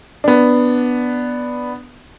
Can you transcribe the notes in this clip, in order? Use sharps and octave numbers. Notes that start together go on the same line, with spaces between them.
B3 D4